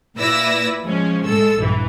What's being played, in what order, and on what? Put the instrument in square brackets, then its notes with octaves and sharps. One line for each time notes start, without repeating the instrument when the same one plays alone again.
[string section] A#2 E4 B4 D5 E6 A#6
F3 G#3 C#4
A2 G#3 A4 E6
A#1 G2 E3